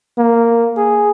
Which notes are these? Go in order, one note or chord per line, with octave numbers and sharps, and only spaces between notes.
A#3
G#4